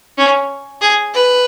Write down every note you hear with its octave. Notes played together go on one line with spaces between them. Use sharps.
C#4
G#4
B4